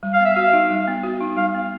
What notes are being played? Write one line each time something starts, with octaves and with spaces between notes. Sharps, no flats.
G3
F5
B3 E5
F#4 F5
D#4
G3
B3
F#4
D#4
G3 F5
B3